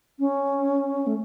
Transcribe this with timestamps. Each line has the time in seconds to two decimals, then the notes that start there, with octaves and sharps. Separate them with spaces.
0.19 C#4
1.07 A3